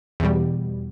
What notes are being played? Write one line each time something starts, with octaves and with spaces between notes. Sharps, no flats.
E2 B2 G3